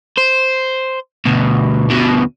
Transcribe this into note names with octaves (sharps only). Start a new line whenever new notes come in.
C5
D2 B2
D2 B2